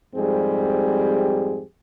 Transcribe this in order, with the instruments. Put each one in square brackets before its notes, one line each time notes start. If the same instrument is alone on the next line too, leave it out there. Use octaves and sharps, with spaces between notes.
[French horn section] F2 G#2 G3 C4 G4 G#4